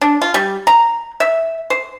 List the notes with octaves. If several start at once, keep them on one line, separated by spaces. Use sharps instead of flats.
D4
F4
G3
A#5
E5
C5